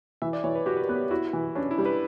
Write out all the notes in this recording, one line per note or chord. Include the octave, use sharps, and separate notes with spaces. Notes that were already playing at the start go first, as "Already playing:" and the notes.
E3 E5
D5
E3 C#5
B4
F#4 G4
B4
A#4
B3
G4
E4 F#4
E3
C#4 D4
E4
G3
B4